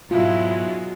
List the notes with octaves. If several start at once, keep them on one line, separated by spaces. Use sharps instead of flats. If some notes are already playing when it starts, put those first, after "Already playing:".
G#2 B2 F#3 G#3 E4 F4